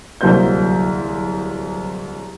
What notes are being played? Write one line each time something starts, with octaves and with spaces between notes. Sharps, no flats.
D1 C2 F#3 A#3 C5 G6